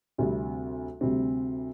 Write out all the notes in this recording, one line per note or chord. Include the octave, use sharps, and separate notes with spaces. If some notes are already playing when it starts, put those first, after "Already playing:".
D2 C3 G3 C4
D2 C3 G3 C4